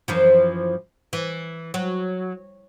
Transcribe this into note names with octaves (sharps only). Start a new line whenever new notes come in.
F#2 E3 F3
E3
F#3